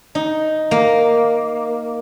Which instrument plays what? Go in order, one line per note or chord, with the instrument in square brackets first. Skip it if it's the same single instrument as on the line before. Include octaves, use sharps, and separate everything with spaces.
[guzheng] D#4
A#3